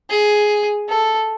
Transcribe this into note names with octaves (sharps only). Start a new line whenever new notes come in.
G#4
A4